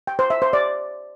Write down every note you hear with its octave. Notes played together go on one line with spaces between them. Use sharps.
G5
C5
E5
C5
D5